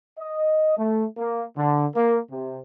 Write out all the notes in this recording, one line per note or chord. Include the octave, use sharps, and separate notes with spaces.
D#5
A3
A#3
D3
A#3
C3